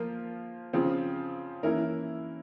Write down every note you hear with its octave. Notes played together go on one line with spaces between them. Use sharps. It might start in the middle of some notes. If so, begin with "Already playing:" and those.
Already playing: F3 A#3 F4 A#4
C#3 F3 C4 F4
E3 A#3 C#4 E4 A#4